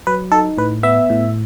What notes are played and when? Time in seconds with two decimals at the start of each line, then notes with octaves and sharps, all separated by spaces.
0.07 F#3 B4
0.32 D#4 A4
0.58 A2 B4
0.83 B3 E5
1.10 A2